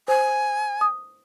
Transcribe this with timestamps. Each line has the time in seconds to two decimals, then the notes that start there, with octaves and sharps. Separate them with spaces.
0.08 C5 G#5
0.81 D#6